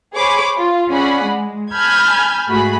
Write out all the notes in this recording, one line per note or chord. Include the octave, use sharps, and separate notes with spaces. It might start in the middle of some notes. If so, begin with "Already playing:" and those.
G#4 C5 C#5 B5 D6
F4
C#4 G#4 D5 F#5 B5
G#3
G#5 A5 B5 F6 G6 G#6
G#2 A3 F#4 G#4 B5